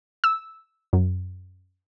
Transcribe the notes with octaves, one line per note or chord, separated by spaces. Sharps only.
E6
F#2